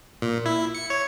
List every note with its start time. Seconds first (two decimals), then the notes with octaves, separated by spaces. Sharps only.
0.22 A#2
0.46 E4
0.75 C#7
0.90 C#5